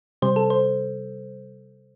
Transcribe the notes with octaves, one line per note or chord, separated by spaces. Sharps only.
C3 G3 C5
A4
C5